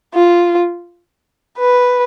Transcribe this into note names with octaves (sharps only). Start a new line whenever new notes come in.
F4
B4